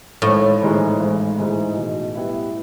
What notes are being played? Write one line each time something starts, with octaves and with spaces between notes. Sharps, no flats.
G#1 A2
G#2 E3 G#3
G#1
G#2 E3 G#3
B2
G3 B3 E4